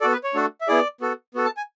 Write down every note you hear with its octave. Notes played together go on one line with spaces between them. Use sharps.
B3 F#4 A4 D5
B4
C#5
A3 D4 F#4 A4
E5
B3 E4 G#4 D5
B3 F#4 A4
B3 F#4 A4
A5
G#5